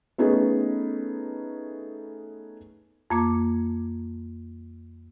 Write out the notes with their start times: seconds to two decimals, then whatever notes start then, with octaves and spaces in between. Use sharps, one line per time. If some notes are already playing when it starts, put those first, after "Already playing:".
0.18 A3 B3 C#4 D#4 G#4 B4
3.10 F2 A#3 D6